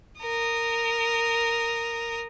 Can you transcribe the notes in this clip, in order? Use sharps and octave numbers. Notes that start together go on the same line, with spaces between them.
A#4 D#6